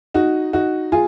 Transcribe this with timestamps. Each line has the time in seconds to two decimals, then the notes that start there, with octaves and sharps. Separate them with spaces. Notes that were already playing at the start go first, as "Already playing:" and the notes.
0.14 D#4 F#4
0.53 D#4 F#4
0.92 F4 G#4